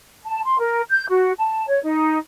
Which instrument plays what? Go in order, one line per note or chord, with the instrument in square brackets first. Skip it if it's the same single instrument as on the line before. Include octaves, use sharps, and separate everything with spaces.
[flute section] A5
C6
A#4
G6
F#4
A5
C#5
D#4